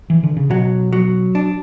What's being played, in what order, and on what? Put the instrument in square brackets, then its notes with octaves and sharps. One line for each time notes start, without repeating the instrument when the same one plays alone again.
[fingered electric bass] E3
D3
C#3
[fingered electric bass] B2 [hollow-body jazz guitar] F#3
[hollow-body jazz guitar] F#3
D4